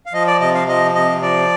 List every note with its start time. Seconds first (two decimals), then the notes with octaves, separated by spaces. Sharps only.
0.06 F5
0.13 F3 D#5
0.27 D5
0.40 C3 D#5
0.54 F5
0.68 F3 D#5
0.95 C3 D#5
1.22 F3 D5